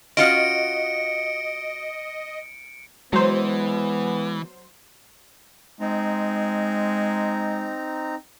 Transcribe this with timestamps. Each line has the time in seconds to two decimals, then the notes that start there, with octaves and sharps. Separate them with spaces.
0.17 C#4 F4 F#4 D#5 C#7 D7
3.13 E3 F#3 G#3 B3 C5
5.80 G#3 C4 D#4 A#5